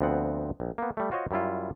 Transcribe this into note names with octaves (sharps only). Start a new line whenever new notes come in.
D2 F3 B3 C4 F#5
A#1
A#3 B3
G3 A3
F4 F#4 C5 C#5 D#5
F#2 G3 E4 F4